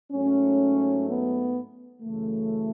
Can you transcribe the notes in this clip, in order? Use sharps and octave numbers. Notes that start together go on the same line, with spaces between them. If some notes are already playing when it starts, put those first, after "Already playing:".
G#2 F#3 A3 C#4
B3
F#2 C#3 E3 A3